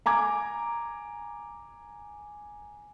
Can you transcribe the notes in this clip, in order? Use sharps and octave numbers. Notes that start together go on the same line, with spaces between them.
G#5 A#5 D6 G#6